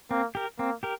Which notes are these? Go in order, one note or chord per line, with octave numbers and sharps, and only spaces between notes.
A#3 C4
G4 A#4
A#3 C4
G4 A#4